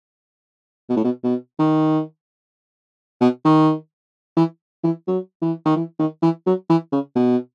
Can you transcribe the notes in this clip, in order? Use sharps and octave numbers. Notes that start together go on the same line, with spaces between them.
B2
A2
B2
B2
D#3
B2
D#3
E3
E3
F#3
E3
D#3
E3
D#3
E3
F#3
E3
C#3
B2